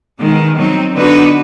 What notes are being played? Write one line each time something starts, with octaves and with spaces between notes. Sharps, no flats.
B2 D#3 G#3
F#3 C4 D#4
D3 B3 D4 D#4 F#4 B4